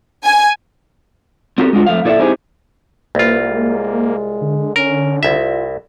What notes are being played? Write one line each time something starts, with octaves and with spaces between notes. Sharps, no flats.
G#5
C4 F#4 G4 A4 A#4
G#3 D4 F4 F#4
F2 A3 F5
A#2 E4 A4 D5 E5
C4 D#4 E4 G4 G#4
C2 A#3 F4 B4
G#3
D3
C#4 A#4
C2 F4 E5